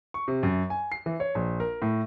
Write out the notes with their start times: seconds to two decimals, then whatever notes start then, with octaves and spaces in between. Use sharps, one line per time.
0.14 C#6
0.28 C3
0.43 F#2
0.70 G#5
0.92 C7
1.06 E3
1.20 C#5
1.35 A#1
1.60 A#4
1.82 A2